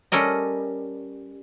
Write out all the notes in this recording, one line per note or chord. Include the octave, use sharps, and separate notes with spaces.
G3 C#4 A4 A#4 D#5